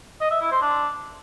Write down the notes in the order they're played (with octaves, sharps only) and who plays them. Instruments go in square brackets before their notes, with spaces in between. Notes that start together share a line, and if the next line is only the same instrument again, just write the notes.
[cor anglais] D#5
E5
E4
C5
D4